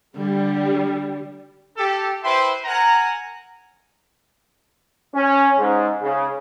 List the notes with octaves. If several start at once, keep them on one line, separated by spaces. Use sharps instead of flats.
D3 G3
G4 A4
E4 B4 C5 E5 G5 C6
A#4 F#5 G#5 A#5
C#4
G#2
C#3